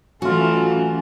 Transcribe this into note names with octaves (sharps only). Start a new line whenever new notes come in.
E3 F#3 A3 C#4 F4 F#4